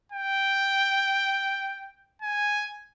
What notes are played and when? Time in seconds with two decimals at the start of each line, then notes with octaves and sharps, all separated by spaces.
0.12 G5
2.22 G#5